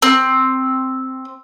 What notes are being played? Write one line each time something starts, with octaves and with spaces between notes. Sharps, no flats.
C4